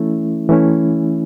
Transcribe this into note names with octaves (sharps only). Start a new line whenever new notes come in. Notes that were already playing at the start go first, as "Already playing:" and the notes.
Already playing: E3 A3 C#4 E4
E3 A3 C#4 E4